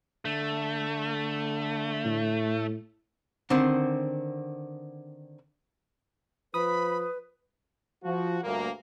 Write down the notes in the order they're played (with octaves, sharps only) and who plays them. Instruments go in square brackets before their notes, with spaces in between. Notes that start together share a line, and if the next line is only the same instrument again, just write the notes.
[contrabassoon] D3 [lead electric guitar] A3
[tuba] A2
[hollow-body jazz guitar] D3 D#3 C4
[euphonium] F3 [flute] B4 [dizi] B5 [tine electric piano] D#6
[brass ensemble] F3 F#4
D2 G2 A#3